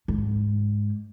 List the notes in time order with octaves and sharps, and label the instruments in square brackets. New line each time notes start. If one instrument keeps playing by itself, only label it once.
[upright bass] G#2